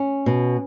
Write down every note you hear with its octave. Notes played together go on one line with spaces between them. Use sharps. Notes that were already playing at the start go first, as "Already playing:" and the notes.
Already playing: C#4
B2